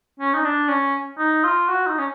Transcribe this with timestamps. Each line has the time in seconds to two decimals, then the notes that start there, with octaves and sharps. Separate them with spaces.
0.20 C#4
0.34 D#4
0.45 D4
0.68 C#4
1.18 D#4
1.44 F4
1.68 F#4
1.87 D#4
1.98 C#4